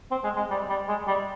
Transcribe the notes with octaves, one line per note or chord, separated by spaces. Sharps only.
C4
G#3
G#3
G3
G3
G#3
G3